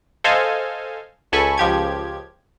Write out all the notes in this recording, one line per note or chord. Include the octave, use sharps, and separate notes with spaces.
A4 C5 D#5 F5 G#5
C#2 A4 G#5 B5 C#6
C#2 F3 G4 G#6